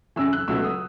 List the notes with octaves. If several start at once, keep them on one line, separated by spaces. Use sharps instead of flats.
F#2 C#3 E3 E6
F#6
C#2 B2 F#3 A3 E6
D#6